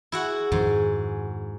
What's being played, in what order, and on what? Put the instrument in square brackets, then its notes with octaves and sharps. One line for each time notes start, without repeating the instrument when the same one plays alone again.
[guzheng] E4 F#4 F#5 [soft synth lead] G#4
[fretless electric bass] F2 D#3 F3 [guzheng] G#2